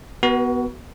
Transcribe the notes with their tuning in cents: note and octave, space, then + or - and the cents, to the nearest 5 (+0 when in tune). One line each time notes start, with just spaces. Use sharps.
B3 +0 F#4 +20 B4 -45